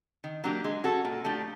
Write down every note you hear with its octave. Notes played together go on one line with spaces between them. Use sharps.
D#3
F#3 A#3 D4 G4
G#3
C#4 F#4 A4
A#2
F3 A3 D4 G4